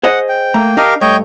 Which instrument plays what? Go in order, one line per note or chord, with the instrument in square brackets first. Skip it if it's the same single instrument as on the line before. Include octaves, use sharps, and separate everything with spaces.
[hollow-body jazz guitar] G#4 C5 D#5 [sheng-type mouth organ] F#5
[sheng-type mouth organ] G5
[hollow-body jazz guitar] A3 A#5 [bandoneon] A#3
[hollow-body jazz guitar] D4 D#5 [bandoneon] G4 A#4 F5
[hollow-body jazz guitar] G2 A3 [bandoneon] C#5 G6 [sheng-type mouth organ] D#5 G5